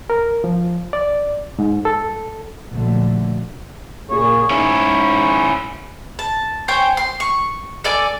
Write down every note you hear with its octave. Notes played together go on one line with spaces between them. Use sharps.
A#4
F3
D5
G#2
A4
A#1 A#2 D3 F#3 A3
A#2 C#3 G#4 C#5
G#2 C#4 E4 C#5
A5
C5 C#5 G5 G#5
C6
C#6
A4 D5 G#5 D6